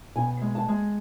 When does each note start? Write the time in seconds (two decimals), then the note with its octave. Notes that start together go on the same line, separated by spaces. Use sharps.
0.15 B2 G#5
0.42 G#3
0.55 A5
0.68 G#3